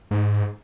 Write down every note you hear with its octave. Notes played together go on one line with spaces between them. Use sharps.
G#2